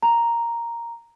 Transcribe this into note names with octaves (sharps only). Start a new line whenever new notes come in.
A#5